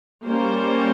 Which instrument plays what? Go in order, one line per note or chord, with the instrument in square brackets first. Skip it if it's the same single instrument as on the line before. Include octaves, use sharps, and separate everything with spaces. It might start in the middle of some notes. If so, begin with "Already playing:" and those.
[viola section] G3 A#3 C#4 C5